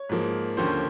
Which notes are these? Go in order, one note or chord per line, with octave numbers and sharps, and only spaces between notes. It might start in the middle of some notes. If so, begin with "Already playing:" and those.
Already playing: C#5
G#2 F3 A#3
D#2 D3 F3 A#3 C#4 C5